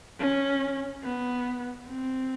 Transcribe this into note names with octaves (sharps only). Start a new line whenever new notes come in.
C#4
B3
C4